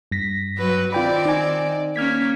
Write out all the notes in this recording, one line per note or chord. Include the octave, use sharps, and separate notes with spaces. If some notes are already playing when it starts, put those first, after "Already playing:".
G2 A#6 B6
F#3 B4
D#3 C4 F4 D5 G5 B5
D#4 G#5
A#3 C#4 F6 G#6 B6